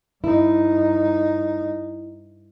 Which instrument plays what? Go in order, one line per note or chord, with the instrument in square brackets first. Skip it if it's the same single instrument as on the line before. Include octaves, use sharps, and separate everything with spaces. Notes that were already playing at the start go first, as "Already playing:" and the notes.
[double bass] G2 D#4 [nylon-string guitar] E4